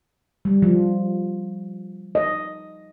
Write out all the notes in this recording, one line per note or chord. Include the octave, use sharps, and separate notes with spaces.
G3
F3
D#5